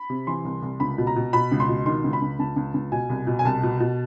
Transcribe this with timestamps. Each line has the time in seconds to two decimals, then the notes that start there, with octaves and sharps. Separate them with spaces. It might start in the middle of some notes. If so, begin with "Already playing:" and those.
Already playing: B5
0.10 C3
0.27 E3 C6
0.45 C2
0.62 C2
0.80 C#2 B5
0.98 B2
1.07 A#5
1.16 B2
1.33 B2 B5
1.52 C#2
1.60 C6
1.69 B2
1.86 D#3 C6
2.04 C#2
2.13 B5
2.22 C#2
2.39 C#2 A5
2.56 C#2
2.74 C#2
2.92 B2 G#5
3.10 C2
3.27 B2
3.39 G#5
3.45 C2 A5
3.63 B2
3.80 B2